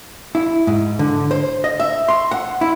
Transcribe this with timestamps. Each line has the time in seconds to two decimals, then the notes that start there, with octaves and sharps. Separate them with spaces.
0.35 E4
0.67 G#2
0.99 D3
1.31 C5
1.64 D#5
1.80 E5
2.08 C6
2.31 F#5
2.61 E4